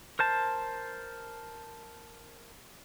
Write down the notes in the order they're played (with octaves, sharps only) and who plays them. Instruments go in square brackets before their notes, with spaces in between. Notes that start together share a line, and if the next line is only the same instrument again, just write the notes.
[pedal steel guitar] A#4 C5 A5